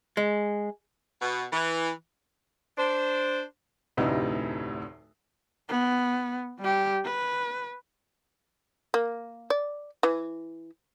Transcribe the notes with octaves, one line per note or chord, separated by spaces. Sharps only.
G#3
B2
E3
D4 C5
F1 D2 A2 C3 D#4 B4
B3
G3 G4
B4
A#3
D5
E3